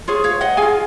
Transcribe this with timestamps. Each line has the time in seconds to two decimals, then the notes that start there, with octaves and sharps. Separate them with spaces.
0.08 F4 G#4 C#5
0.24 C#5 F5
0.41 D#5 F#5
0.57 F4 G#4 F5 G#5